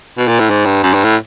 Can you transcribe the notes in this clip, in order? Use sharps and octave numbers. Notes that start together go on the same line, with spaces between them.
B2
A#2
A2
G#2
G2
F#2
G2
A2